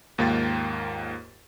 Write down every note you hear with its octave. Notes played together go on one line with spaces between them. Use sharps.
D#2 G#2 A#3 F4 G5 A6